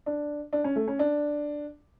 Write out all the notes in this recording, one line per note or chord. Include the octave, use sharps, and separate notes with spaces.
D4
D4
C#4
A3
C#4
D4